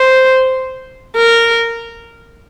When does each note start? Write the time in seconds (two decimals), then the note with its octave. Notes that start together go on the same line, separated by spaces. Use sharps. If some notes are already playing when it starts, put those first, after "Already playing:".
Already playing: C5
1.17 A#4